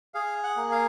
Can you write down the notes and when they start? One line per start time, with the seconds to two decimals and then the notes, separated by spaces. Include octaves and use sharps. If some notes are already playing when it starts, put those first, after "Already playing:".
0.14 G#4 F5
0.44 F#5
0.57 A#3
0.71 F5